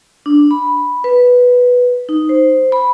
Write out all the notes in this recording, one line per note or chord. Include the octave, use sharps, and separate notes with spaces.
D4
B5
B4
D#4
C5
B5